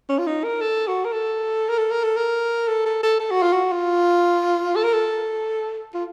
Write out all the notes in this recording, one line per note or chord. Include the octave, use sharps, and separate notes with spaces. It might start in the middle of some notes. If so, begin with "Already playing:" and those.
C#4
F4
D#4
A#4
A4
F#4
A#4
A4
A#4
A4
A#4
A4
A#4
A4
A4
A4
A4
F#4
F4
F#4
F4
A4
A#4
A4
F4